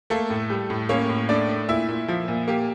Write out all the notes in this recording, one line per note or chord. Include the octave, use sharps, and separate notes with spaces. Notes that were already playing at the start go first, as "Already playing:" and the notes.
A3 A#3 A4
A2
G3
A2
A#3 C#4 C#5
A2
A3 D4 D5
A3
A#2 E4 E5
A#2
F3
A#2
A#3 G4